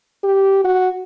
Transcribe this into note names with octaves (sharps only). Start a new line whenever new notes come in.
G4
F#4